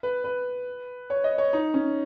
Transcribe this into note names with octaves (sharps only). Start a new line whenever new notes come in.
B4
B4
C#5
D#5
C#5
D#4
C#4